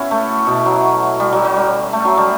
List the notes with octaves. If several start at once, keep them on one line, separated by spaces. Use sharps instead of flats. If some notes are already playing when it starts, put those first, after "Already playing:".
Already playing: B3 C#4 E4 F#4
A3
B2
F#3
G3
F#3
F#3
G3
A3
F#3
G3